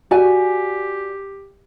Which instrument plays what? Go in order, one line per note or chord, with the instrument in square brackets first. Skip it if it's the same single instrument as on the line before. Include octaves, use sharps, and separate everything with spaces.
[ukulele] F#4 D5 G#5 [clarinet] G4